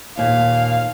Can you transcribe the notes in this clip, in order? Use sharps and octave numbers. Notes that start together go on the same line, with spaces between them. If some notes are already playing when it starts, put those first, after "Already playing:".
D#2 A#2 F5